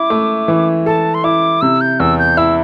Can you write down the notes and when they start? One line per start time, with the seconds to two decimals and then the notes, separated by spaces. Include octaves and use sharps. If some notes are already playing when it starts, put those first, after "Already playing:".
Already playing: E4 D6
0.10 A3
0.48 E3
0.86 A4 A5
1.14 C6
1.24 E4 D6
1.61 C3 E6
1.81 G6
2.00 E2 E6
2.19 G6
2.37 E4 E6